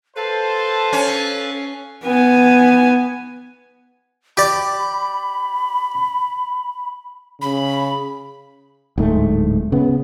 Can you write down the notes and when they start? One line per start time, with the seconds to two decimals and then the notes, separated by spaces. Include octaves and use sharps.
0.16 A4 B4 C5 F5 A5
0.93 C#4
2.04 B3 G#5
4.37 G4 D5 B5
7.42 C#3 B5
8.98 D1 G#2 A3
9.72 C#3 B3